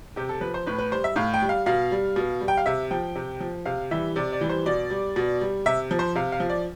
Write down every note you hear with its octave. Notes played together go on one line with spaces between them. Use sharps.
C3 G4
A4
F3 B4
C5
A2 B4
B4
G3 C5
E5
A2 F5
G5
G3
F5
B2 F5
G3
B2
G3
G5
F5
C3 E5
F3 G5
C3
F3
C3 F5
E3 G3 E5
C3 D5
D5
E3 G3
C5
B2 D5
G3
B2
G3
C3 E5
F3
C5
C3 F5
F5
F3
D5